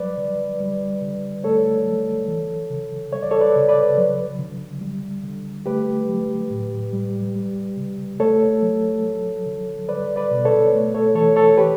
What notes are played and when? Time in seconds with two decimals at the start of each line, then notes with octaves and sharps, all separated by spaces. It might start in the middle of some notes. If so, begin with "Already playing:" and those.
Already playing: F#3 G3 B4 D5
0.18 D3
0.60 G3
1.02 D3
1.44 A3 A4 C#5
1.86 F#3
2.28 E3
2.70 C#3
3.13 G3 C#5
3.23 D5
3.31 A4 C#5
3.41 B4 D5
3.56 C#3
3.69 B4 D5
3.97 F#3
4.39 D3
4.81 G3
5.23 D3
5.66 A3 G4 B4
6.08 F#3
6.50 A2
6.93 G3
7.36 G3
7.77 C#3
8.20 A3 A4 C#5
8.62 F#3
9.03 F#3
9.46 D3
9.89 G3 B4 D5
10.16 B4 D5
10.31 B2
10.45 A4 C#5
10.73 A3
10.94 A4 C#5
11.15 E3 A4 C#5
11.36 A4 C#5
11.57 E3 G4 B4